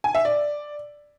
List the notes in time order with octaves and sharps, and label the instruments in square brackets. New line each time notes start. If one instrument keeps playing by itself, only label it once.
[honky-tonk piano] G#5
E5
D5